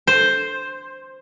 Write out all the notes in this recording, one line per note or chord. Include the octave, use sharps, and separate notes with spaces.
C5